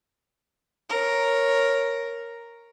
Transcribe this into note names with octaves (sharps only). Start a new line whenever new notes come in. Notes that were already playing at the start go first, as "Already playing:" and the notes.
A#4 C#5